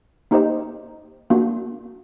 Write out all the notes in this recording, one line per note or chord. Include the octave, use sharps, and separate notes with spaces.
A#3 D#4 G4 C5 D#5
A#3 D4 F#4